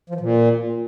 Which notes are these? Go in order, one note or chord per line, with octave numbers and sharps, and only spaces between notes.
F3
E3
A#2